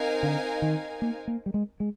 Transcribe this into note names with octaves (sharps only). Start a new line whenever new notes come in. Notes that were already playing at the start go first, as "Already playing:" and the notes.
Already playing: C4 D#4 A#4 F5 G#5
D3
D#3
A#3
A#3
G3
G#3
G#3